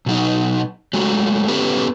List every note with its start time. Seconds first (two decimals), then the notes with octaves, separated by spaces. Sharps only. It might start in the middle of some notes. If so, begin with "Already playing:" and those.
0.06 B2 F#3 D#4
0.93 F#3 G#3 A3 F#4
1.48 B3 C#4 G4 A4 B4